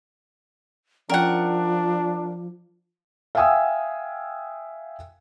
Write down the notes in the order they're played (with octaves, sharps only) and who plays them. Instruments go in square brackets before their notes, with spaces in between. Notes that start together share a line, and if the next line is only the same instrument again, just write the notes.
[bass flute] F3 [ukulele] C#4 D5 G5 [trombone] D4 [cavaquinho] A#4 F#5
[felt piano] E5 F5 G5 G#5 D#6 E6